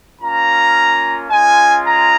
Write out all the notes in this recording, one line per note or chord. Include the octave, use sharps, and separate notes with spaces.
A#3 C#4 F4 A#5
G#3 C#4 F4 G#5
A#5